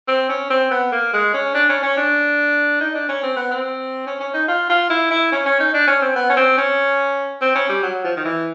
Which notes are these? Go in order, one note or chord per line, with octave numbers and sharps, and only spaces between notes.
C4
C#4
C4
B3
A#3
G#3
C#4
D4
C#4
C#4
D4
D#4
D4
C#4
C4
B3
C4
C#4
C#4
D#4
F4
F4
E4
E4
C#4
C#4
D#4
D4
C#4
C4
B3
C#4
C4
C#4
C4
C#4
G3
F#3
F3
D#3
E3